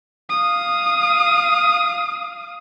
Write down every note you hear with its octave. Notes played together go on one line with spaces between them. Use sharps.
F5 D#6